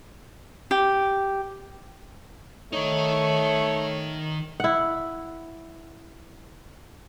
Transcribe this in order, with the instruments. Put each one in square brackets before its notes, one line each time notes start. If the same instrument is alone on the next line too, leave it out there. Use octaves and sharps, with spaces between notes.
[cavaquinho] G4
[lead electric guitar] D#3 D#4 [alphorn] A3 [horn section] C#5
[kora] E4 F#5